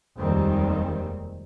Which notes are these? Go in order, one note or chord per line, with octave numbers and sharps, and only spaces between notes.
F1 D#2 D#3 G3 G#3 C4